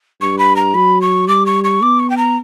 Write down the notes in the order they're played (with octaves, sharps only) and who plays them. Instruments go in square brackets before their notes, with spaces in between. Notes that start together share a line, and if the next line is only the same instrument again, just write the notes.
[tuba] G2 [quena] C#6
[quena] B5
A#5
[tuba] F#3 [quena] B5
[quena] C#6
[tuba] G3 [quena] D6
[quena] C#6
C#6
[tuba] B3 [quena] D6
[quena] C#6
G5
A#5